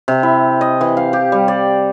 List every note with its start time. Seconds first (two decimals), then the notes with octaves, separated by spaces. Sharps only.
0.08 C3
0.23 E4
0.61 D#5
0.81 E3
0.97 F5
1.13 G4
1.32 G3
1.48 D5